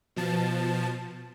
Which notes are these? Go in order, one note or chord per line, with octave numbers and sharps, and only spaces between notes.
B2 F3 A5